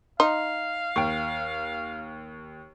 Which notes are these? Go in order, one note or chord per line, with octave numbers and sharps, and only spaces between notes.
D#4 F5 C6
D#2 G5 C#6